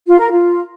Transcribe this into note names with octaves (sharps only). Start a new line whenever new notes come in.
F4
A#4
F4